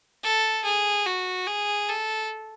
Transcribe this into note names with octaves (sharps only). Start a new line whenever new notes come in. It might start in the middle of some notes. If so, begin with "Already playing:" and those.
A4
G#4
F#4
G#4
A4